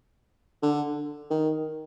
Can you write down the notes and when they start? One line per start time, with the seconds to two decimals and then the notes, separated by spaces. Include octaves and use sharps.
0.63 D3
1.31 D#3